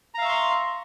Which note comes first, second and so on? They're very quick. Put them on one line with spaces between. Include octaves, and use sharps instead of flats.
A#5 F5 E5 C#6 C6